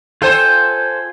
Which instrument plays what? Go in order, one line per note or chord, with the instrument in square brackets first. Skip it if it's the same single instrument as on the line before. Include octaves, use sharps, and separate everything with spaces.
[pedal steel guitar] F4 G5 G#5 [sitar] A4 C5